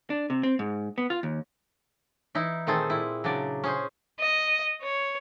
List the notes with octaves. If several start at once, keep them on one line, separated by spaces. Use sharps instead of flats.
D4
C3
C4
G#2
B3
F4
D#2
E3 D#4 E4
A#2 D#3 A3 C4 G#4 A4
A#2 E4
C#3 F#3 D4 D5
C#4 G#4 C5
D#5
C#5